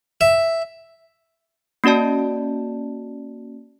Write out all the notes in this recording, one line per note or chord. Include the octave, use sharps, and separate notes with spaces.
E5
A#3 C#4 F#4 D5 A5